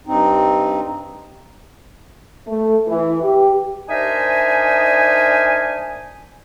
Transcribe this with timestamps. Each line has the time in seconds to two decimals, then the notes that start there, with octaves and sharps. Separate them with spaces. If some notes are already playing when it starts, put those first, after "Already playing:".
0.07 G2 C4 D#4
2.47 A3
2.88 E3
3.22 G4
3.89 D4 D#4 A#4 C5 E5 G#5